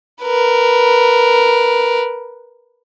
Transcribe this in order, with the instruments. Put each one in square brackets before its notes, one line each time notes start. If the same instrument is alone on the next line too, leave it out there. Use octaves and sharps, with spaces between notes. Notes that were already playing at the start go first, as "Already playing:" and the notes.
[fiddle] A#4 B4